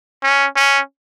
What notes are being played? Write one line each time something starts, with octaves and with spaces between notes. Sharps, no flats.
C#4
C#4